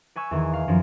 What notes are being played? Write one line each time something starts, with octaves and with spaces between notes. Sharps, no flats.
B4 G#5 C#6 E6
E2 D#3 G#5
F5
F#2 D#3 F3